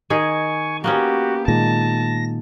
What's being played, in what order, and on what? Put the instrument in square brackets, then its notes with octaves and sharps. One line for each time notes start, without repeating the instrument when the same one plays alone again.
[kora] D#3 G#4 [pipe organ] G#5 C#6
[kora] A#3 B3 C#4 [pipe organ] F#4 [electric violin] G4
[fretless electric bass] A#2 D#3 G#3 [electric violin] A5 [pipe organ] A#6